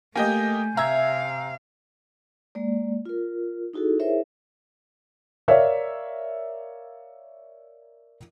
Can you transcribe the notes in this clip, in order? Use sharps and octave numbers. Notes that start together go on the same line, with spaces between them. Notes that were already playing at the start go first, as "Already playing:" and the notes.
A3 A#3 G4 D#5 G#5 G6
C3 E5 F5 A#5 E6 G#6
G#3 A#3 D5
F4 A#4
D#4 E4 F#4 G#4 A4
E4 G#4 A#4 C5 C#5 E5
A#4 C#5 D5 E5 F5